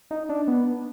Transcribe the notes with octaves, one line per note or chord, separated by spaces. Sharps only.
D#4
D4
B3